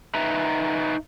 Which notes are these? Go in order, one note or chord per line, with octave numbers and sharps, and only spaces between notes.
D#4 B4 E5 A#5